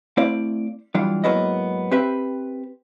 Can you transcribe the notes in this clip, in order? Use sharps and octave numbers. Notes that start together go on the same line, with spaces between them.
A3 C4 E4 C5 D5 F5
E3 F#3 G3 D4 F4
G#2 F#3 A#3 B3 E4 D#5
C4 G4 B4 E5